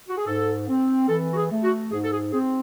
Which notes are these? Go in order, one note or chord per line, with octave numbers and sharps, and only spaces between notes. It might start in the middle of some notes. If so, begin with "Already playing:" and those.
F#4
G#4
G#2 A4
C4
E3 A4
F#4
G#4
A3
F#4
G#2 G#4
A4
G#4
C4 G#4